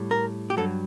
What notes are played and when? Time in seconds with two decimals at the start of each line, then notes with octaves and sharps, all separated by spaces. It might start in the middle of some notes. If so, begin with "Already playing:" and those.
Already playing: A2 G3
0.11 A#4
0.50 G4
0.57 G2 F#3 A4